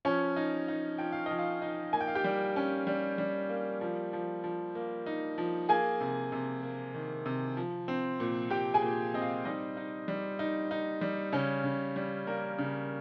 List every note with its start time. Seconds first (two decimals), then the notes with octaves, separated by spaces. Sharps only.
0.05 F3 C#4 C#5
0.36 D#4
0.68 D#4
0.98 F3 G5
1.12 F5
1.26 F3 D#5
1.39 F4 F5
1.62 D#4
1.93 A#3 G#5
2.01 G5
2.08 F5
2.15 G4 G5
2.24 G3
2.56 C#4
2.87 G3
3.18 G3
3.49 A#3
3.81 F3
4.13 F3
4.44 F3
4.75 A#3
5.06 D#4
5.38 F3
5.69 A#3 G#4 G#5
6.00 C3
6.32 C3
6.63 A#3
6.94 D#3
7.26 C3
7.57 F3
7.88 C4
8.20 A#2
8.50 A#2 G4 G5
8.74 G#4 G#5
8.83 A#2
9.14 C4 D#5
9.21 F4 F5
9.45 G3 D#4 D#5
9.77 D#4
10.08 G3
10.39 D#4
10.71 D#4
11.01 G3
11.32 C#3 C#4 C#5
11.64 C#3
11.96 G3
12.26 G3 A#3 A#4
12.58 C#3